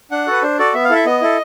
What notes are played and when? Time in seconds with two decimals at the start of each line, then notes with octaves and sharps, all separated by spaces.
0.11 D4 F#5
0.27 F#4 A4 B4
0.43 D4 C5
0.59 F#4 A4 D5
0.75 B3 E5
0.85 F5
0.90 E4 A4
0.95 E5
1.05 B3 D#5
1.22 E4 A4